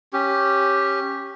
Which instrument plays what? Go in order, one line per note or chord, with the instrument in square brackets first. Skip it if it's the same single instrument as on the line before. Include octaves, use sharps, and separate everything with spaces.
[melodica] C#4 G4